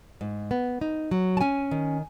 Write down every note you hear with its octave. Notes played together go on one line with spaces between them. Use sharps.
G#2
B3
D#4
F#3
A5
C#4 G#5
D#3